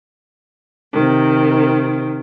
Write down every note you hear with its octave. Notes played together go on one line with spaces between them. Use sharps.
C3 D#3